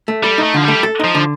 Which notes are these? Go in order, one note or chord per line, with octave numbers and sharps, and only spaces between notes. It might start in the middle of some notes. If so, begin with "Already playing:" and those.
A3
G3 A4
A3 D#4
D3 F3
G3 A3
A4
F3 D#4
D3